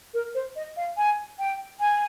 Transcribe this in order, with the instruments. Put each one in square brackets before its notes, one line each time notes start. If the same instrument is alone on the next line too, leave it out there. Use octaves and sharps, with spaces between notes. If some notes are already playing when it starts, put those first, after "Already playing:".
[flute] A#4
C5
D#5
F5
G#5
G5
G#5